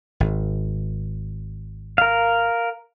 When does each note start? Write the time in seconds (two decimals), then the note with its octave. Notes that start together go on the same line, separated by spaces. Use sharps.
0.20 G#1
1.98 A#4 F5